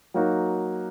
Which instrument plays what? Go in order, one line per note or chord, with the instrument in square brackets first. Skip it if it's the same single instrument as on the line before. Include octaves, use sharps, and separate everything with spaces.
[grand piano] F#3 A#3 D#4 F#4